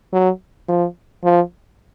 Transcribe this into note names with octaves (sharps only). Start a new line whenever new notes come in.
F#3
F3
F3